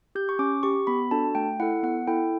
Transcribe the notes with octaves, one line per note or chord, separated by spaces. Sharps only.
G4 G6
C#6
C#4 D6
G4 C#6
B3 B5
D4 F#4 A4 A5
A3 G5
E4 A4 F#5
B3 F#5
E4 A4 G5